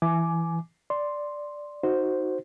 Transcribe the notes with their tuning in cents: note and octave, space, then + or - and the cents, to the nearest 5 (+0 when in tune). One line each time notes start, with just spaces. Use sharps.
E3 +5 G#5 +20 D6 +0
D5 +0 C6 +0
D#4 +0 F#4 +0 C5 +0